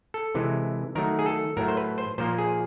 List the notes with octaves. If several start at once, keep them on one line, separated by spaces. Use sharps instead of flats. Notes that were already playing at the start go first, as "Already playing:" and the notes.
A4
C3 E3 G#3
D#3 F#3 A3 A#4
G#4
A4
A2 F#3 A3 A#4
C5
B4
C5
A#2 F3 A#3 C5
G#4